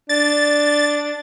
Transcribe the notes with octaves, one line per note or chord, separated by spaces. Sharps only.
D4 A6